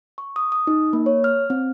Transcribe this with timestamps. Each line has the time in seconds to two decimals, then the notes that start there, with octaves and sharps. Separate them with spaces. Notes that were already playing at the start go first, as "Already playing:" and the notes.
0.18 C#6
0.36 D#6
0.52 D#6
0.67 D#4
0.93 A#3
1.06 C#5
1.24 F6
1.50 C4